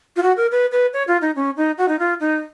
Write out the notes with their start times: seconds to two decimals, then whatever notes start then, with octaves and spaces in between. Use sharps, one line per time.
0.16 F4
0.23 F#4
0.37 A#4
0.51 B4
0.72 B4
0.93 C#5
1.08 F4
1.22 D#4
1.36 C#4
1.57 D#4
1.78 F#4
1.88 D#4
1.99 F4
2.20 D#4